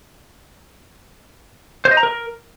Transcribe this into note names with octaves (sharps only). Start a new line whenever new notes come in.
C5
D#5
A#5
A#4